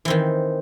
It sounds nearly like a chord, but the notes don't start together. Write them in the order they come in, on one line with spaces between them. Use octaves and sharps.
E3 C4 D#3